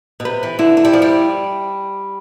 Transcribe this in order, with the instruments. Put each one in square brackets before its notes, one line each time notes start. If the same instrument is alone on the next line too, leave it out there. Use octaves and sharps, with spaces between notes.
[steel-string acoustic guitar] B2
[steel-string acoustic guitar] C3 [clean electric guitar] B4
[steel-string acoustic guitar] E3
[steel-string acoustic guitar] D3 [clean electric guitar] E4
[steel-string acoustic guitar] A3
G3
[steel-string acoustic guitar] F3 [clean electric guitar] D5
[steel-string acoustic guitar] G3